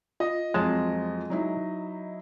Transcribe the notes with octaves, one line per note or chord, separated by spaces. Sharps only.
F4 D#5 D#6
F2 F#3 G#3 C4 A5
F#3 D#4 E4